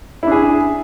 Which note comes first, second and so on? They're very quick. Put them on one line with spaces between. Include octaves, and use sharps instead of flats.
E4 D4 G#4